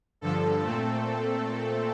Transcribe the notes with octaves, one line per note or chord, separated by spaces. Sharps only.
G2 D3 F3 A4
A#2 A3 C4